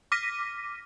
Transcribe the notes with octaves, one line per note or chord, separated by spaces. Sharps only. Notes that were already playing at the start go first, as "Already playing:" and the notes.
D6 F6 A#6 B6 D#7